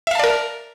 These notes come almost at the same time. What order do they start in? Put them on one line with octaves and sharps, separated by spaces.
E5 F5 A5 D5 A#4